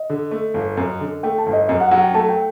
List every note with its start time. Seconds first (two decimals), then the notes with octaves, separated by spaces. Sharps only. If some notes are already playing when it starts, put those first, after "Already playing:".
Already playing: D#5
0.10 D3
0.31 A3
0.54 G1
0.77 F#2
1.00 D3
1.23 A3 G5
1.38 A5
1.46 G1
1.53 D#5
1.68 F#2 D#5
1.80 F#5
1.91 F#3 F#5
2.03 G5
2.14 A3 A5
2.29 G5